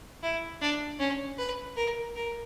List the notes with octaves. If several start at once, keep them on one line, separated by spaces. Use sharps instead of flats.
E4
D4
C#4
B4
A#4
A#4